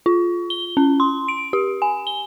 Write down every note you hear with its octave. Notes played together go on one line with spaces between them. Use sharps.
F4
G7
C#4
C6
D7
G4
G#5
G7